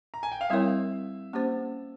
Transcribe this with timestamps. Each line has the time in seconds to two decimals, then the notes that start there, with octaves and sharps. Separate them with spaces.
0.14 A#5
0.23 G#5
0.32 G5
0.41 F5
0.50 G3 C4 E4 A#4 C#5 E5
1.33 A#3 C#4 G4 C5